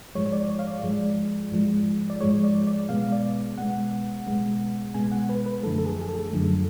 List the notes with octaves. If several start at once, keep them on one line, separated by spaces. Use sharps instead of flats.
G#2 F3 G#3 C#5
C#5
D5
C#5
F5
D5
G#2 F3 G#3
G#2 F3 G#3
D5
G#2 F3 G#3 C#5
D5
D5
B2 G#3 B3 F5
D5
B2 G#3 B3 F#5
B2 G#3 B3
B2 G#3 B3 G#5
F#5
B4
B4
F#2 D3 F3 A3 A4
A4
G#4
G#4
A4
F#2 D3 F3 A3